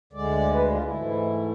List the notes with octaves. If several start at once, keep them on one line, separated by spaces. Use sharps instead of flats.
D2 D3 G#3 D5
B4
F4
E4
G#2 E3 A3